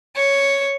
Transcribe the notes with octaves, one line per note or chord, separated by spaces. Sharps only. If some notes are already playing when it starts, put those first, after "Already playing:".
C#5